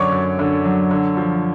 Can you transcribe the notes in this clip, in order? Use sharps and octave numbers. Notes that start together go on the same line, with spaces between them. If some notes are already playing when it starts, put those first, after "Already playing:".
Already playing: F#2 D3 F#3 C#5 D5 C#6 D6
F#2
D3
F#3
D3
F3